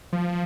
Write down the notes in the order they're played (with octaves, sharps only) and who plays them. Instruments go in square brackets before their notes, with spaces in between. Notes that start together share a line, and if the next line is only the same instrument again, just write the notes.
[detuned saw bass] F3